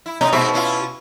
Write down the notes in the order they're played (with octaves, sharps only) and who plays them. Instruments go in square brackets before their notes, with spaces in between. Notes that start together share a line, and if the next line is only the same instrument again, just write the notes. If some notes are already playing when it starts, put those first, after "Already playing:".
[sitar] E4
[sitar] A2 C#4 [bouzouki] D#4
[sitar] G#2 C4 E5 [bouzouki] B2
[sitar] C#4 E4 F4